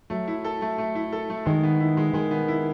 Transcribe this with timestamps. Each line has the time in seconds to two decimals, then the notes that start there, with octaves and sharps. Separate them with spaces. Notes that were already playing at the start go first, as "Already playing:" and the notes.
0.10 F#3 A3
0.27 E4
0.44 A4
0.62 A3
0.78 A3
0.95 E4
1.13 A4
1.30 A3
1.46 D#3 G#3
1.63 B3
1.80 E4
1.97 G#3
2.13 D#3 G#3
2.31 B3
2.48 E4